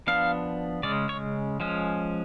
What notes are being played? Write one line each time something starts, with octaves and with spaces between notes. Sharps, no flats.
F3 B3 D4 F5
C#3 G#3 C#4 D5
C#5
F3 G#3 C#4